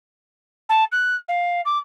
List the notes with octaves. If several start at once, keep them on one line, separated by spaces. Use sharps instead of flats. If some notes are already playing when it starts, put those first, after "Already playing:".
A5
F#6
F5
D6